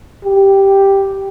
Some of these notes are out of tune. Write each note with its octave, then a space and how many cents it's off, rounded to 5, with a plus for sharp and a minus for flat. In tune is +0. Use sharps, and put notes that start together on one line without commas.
G4 +0